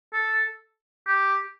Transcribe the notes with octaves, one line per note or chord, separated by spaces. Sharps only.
A4
G4